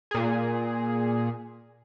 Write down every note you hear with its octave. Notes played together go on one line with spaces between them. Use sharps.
A#2 G#4